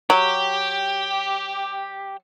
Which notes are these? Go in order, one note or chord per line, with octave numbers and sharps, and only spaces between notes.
F#3 G4